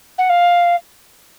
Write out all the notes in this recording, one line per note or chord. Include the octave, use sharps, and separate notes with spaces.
F#5
F5